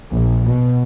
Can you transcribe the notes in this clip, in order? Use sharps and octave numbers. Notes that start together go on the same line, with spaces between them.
A#1
B2